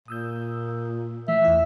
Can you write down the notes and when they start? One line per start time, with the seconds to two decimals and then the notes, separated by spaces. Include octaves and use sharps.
0.08 A#2 D#6 E6 G6
1.28 E3 A3 E5
1.45 E2 E4